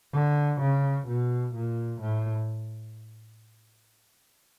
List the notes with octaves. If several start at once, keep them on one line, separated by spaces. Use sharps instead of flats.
D3
C#3
B2
A#2
A2